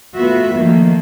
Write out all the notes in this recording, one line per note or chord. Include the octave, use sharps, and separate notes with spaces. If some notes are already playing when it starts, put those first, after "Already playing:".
A3 B3 F4 F#4 E5
D#3 F3 A3 A#3